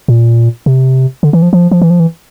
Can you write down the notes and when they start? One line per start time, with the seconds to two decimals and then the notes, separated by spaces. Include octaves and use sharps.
0.08 A#2
0.66 C3
1.23 D3
1.33 E3
1.42 F3
1.53 F3
1.71 F3
1.82 E3
1.90 F3
2.00 E3